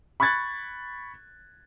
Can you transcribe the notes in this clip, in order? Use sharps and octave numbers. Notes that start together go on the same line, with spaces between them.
B5 C#6 F#6 G#6 A6